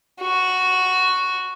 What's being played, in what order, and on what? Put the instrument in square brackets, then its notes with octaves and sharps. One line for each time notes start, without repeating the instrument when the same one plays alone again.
[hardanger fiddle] F#4